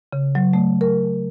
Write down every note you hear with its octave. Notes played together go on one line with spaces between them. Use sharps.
C#3
F#3
A3
A#4